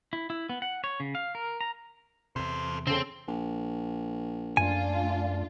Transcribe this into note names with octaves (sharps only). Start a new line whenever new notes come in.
E4
E4
B3
F#5
C#5
C#3
F5
A#4
A#5
E2 C3 A4 C5
C#3 C4 A4 C5
A#1
F#2 A3 D4 F4 G#5